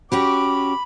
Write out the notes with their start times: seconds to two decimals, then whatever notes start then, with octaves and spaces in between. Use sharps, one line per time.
0.12 C#4 F#4 G4 B5 D6